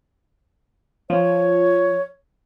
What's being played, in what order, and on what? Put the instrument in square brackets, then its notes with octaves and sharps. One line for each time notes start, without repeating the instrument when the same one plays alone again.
[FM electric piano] F3 [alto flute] C#5